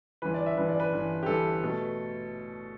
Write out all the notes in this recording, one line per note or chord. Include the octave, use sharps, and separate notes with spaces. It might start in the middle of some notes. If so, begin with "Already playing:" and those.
G1 G2 E3 B4
D5
E5
G1 G2 E3 B4
D5
B4
G1 G2 E3
G4
G1 G2 E3 A4
B2 A3